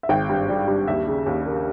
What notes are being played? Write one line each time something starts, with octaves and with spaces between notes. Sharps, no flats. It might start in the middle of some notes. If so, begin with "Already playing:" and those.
E5
G#1 G5
G2
G3
G2
D#2 E5
C#3
D#2
A#3